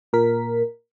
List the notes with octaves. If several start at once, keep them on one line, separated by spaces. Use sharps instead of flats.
A#2 A#4 B6